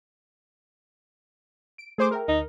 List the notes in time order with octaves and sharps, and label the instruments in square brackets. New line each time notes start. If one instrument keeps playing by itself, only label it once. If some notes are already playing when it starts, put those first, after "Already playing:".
[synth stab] D7
[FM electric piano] A3 [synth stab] G#4 C5 D6
[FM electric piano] G#4 E5 G5 [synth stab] A#4
[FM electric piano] D2 [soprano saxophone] D#4